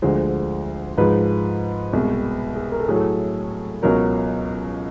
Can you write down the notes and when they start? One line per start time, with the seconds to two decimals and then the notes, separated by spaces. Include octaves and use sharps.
0.02 D2 D3 F3 G#3 C5
0.98 G#2 F3 G#3 B4
1.93 C2 B2 G#3
2.56 G#4
2.72 A#4
2.80 A4
2.88 A2 F#3 G#4
2.96 A4
3.83 C#2 B2 F#3 A#4